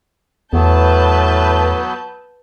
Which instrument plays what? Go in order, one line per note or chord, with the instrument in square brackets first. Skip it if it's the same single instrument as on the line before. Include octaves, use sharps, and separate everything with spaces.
[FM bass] E2 [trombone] A2 [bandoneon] F#3 B3 [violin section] B4 A5 G6